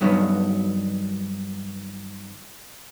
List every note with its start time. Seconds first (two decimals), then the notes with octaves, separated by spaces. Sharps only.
0.01 G2 D#3 F#3 B3